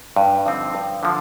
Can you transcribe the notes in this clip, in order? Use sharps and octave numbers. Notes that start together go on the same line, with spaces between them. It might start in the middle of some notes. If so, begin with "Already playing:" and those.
G2
D3 F3 C4 D#4
G2
D3 F3